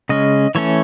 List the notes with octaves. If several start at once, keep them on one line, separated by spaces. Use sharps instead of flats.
C#3 G#3 C#4 D#5
E3 A3 C#4 C#5